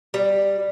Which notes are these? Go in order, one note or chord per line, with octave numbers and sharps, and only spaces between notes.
G3